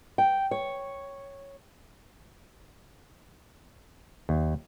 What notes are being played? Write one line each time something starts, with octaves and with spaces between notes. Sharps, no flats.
G5
C#5
D#2